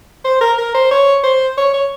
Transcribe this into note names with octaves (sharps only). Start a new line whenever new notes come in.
C5
A#4
A#4
C5
C#5
C5
C#5
C#5